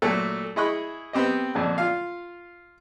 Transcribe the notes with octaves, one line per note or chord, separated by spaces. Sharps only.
A#2 F#3 A3
E4 G#4 D#5 B5 C#6 F#6
B3 C4 G4 D#5
F2 A#2 D3
F4 F5